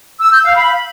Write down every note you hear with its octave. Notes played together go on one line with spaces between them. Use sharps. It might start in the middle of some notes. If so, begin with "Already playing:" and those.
E6
G6
F5
B5